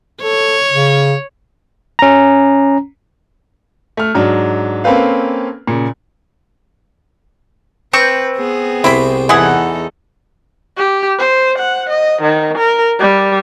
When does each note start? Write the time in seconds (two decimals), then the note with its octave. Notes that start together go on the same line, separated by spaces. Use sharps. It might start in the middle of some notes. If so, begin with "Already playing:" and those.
0.23 A4 C#5
0.71 C#3
1.99 C#4 A#5
3.97 A3 F6
4.15 G#2 F#3 D4
4.84 A#3 C4 C#4 A4 B4 F5
5.67 A#2 C#3
7.93 C4 B4 C#6 G6
8.37 B3 G#4
8.84 C2 E4 C5 G5 B5
9.29 E2 E3 D#4 E4 G#4 A4 F#5
10.77 G4
11.19 C5
11.58 F#5
11.90 D#5
12.22 D#3
12.58 A#4
13.00 G3